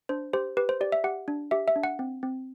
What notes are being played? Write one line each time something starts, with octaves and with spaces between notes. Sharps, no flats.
D4 C5
G4 C5
G4 B4
C5
G4 D5
E5
G4 F#5
D4
G4 E5
E5
D4
F#5
C4
C4